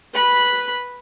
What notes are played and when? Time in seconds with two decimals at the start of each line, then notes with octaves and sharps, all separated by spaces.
0.14 B4 B5